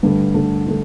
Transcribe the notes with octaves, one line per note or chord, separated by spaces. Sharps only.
G2 D3 A3
G2 D3 A3
D3 A3